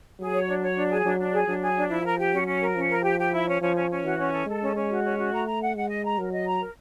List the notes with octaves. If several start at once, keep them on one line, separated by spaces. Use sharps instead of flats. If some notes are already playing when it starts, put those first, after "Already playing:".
F#3 G#4
C#5
D4
C#5
D4
G#4
F#3 D4
D4
G#4
F#3 D4
G#4
D4
F3 E4
A#4
G4
F#3 C#4
C#4
A#4
F3 C#4
A#4
G4
G4
E4
C#4
F3 C#4
C#4
C#4
E3 F#4
C#4
A4
G#3 A4
C#4
C#4
F#4
C#4
F#4
A3 A#5
A#5
F#5
G#3 F#5
D#5
A#5
F#3 A#4
D#5
A#5
A#4